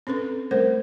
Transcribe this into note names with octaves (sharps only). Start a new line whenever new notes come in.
C4 C#4 A4 B4
G3 A3 A#4 C5